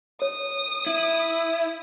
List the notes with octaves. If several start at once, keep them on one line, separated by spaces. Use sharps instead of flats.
C#5 D#6
E4